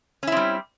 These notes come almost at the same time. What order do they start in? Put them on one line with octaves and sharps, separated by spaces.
C#4 E4 C4 G3